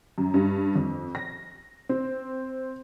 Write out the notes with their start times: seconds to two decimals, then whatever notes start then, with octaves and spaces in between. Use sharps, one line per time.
0.18 F#2
0.34 G2
0.75 F2
1.15 A#6
1.89 C4